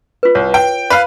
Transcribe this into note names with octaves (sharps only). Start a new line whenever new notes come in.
F4 B4
C2 C#5
G5
B4 F5 B5